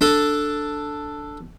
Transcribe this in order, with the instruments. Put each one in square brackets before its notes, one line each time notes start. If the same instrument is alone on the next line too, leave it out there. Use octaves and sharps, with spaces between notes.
[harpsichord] D4 A4